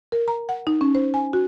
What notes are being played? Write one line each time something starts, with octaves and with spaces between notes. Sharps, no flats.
A#4
A#5
F#5
D#4
C#4
C5
G#5
F#4